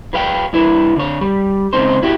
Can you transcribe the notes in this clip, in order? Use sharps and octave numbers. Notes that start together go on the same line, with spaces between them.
F#3 B4 F5 G5
G2 E4 B4
D3 C#5
G3
G#2 C#3 C4 D#4 C5
E4 F#4 G4